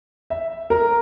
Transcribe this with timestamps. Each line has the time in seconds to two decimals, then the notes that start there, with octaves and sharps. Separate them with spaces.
0.30 E5
0.70 A#4